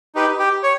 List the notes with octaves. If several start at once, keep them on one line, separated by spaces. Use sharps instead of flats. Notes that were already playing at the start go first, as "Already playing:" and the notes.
D#4 G4 B4
G4
C#5